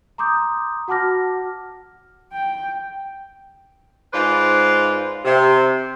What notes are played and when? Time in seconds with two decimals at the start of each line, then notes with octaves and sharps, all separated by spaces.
0.18 A#5 C6 D6 D#6 G6
0.88 F#4 F#5 A5 D6 F6 A#6
2.33 G5
4.13 G#2 F4 B4 C5 D5
5.24 C3